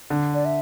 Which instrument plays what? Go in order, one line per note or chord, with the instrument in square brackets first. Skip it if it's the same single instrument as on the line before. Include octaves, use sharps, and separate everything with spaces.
[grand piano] D3
[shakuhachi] D5
E5